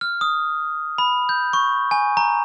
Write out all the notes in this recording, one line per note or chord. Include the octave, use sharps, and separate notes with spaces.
F6
D#6
B5
G6
C#6
G#5
A#5